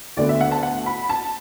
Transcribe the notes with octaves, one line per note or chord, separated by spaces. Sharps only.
D2 D3 B3 D5
E5
F#5
A5
F#5
B5
A5